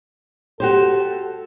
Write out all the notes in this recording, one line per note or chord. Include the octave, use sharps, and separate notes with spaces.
F#4 G4 A4 C5